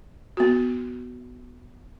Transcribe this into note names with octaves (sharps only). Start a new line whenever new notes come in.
B3 F#4